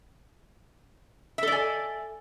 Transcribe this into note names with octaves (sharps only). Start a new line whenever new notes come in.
A4 D5 E5 G#5